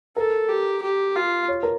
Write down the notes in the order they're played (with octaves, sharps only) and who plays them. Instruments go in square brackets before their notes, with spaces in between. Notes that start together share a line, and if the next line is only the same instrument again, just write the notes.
[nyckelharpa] A4 [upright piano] A#4
[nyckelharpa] G4
G4
F4
[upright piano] C#5
A#4